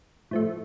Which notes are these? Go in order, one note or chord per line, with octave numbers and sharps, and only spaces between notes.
A2 F3 A3